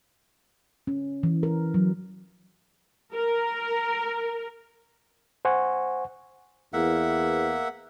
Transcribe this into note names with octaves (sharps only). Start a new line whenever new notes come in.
C#4
E3
A#4
F#3
A#4
C5 F#5 G#5 C#6
E2 A#3 E5 F#5